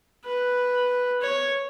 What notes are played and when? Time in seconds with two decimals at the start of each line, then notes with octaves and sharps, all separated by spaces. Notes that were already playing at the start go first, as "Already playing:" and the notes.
0.24 B4
1.21 C#5